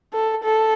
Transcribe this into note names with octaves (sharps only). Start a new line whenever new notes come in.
A4
A4